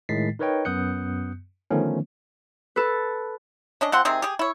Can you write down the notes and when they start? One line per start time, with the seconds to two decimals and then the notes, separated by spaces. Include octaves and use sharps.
0.09 A2 D#3 G#3 A6 B6 C7
0.39 D#4 A#4 B4 C#5 D#5 G5
0.65 F#2 B3 D#6 F#6 G6 C#7
1.70 D3 D#3 F3 A3 B3 C#4
2.76 A4 B4
3.81 C#4 D4 D#5
3.92 F3 C4 F#5 C6
4.05 C3 D#3 C4 G#4
4.22 G4 G#4
4.39 E4 C#5